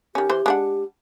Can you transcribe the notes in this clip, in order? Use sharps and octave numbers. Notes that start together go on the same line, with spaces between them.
D#3 C#4 G4
E3 C5
G#3 D4 F#5